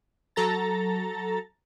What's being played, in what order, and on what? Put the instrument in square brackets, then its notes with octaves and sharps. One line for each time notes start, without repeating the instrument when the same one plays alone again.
[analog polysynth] F#3 A4 A#5 A6